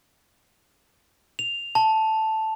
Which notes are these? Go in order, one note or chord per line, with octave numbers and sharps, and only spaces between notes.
F7
A5